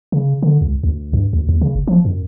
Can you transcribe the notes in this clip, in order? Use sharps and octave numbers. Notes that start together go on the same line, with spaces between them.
C#3
D3
C#2
D2
G2
D2
D#2
C#3
F1
F3
F#2